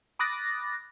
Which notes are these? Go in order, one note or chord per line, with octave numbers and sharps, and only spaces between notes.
B5 D6 D#6 F#6 A6 A#6